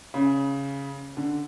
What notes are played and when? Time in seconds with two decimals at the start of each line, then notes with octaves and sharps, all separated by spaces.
0.14 C#3
1.17 D3